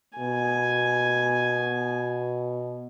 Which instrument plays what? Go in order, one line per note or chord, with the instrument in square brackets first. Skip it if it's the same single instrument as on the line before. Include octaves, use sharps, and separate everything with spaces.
[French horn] B2 [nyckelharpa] G#5